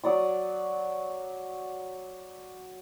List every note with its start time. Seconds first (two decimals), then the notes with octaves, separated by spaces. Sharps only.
0.04 F#3 D5 D#6